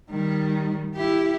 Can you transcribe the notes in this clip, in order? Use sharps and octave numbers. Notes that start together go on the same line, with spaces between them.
D#3 G3
E4 G4